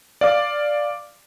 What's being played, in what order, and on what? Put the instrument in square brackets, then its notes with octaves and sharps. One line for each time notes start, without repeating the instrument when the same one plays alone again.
[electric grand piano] D5 F5 D6